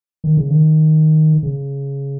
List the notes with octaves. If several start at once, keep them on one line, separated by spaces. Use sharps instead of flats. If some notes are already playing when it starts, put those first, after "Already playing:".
D#3
C#3
D#3
C#3